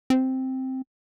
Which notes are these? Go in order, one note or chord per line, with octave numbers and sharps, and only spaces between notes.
C4